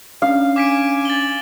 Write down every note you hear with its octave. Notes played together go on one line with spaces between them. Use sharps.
C#4 D4 F5
G#5 D6 B6 D7
A6 F#7 G7